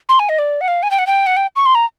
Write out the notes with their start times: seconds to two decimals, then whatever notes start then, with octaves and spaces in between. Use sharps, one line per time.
0.09 C6
0.19 G#5
0.29 D#5
0.39 D5
0.61 F#5
0.68 F5
0.83 G#5
0.91 G5
0.99 F#5
1.07 G5
1.26 F#5
1.37 G5
1.56 C#6
1.66 C6
1.75 A#5